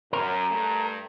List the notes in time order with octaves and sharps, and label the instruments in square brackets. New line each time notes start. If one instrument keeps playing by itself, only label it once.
[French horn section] F#2 [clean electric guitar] A#4
[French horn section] G2 A3